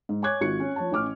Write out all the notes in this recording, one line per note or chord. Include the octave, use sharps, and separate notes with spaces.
G#2
C#5 G#5 C#6 D6 F#6 G#6
G#1 F4 F#4 C#6 C#7
C#4
F3 C#5 A5
A1 C#4 D6 F6